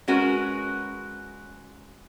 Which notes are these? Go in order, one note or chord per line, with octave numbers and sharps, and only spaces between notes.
G#3 C#4 F#4 A#4 B4